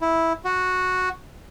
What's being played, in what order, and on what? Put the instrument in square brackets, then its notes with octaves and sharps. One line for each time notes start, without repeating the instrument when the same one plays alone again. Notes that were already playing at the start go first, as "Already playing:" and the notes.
[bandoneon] E4
F#4